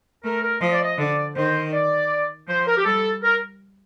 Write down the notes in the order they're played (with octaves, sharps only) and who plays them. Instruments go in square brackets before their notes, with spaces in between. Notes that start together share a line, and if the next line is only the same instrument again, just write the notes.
[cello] A3 [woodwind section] A#4
[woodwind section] A#4
[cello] F3 [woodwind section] D#5
[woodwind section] D5
D#5
[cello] D3 [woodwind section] D5
[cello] D#3 [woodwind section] C5
[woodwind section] D5
[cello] F3 [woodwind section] C5
[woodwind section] A#4
G4
[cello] G3 [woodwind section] A4
[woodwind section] A#4